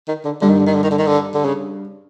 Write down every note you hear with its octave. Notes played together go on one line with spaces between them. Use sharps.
D#3
D3
G2 D3
D#3
D3
D#3
D3
D#3
D3
D#3
D3
D3
C#3